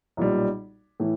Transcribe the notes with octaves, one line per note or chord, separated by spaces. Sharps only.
B1 A#2 G3
A2 E3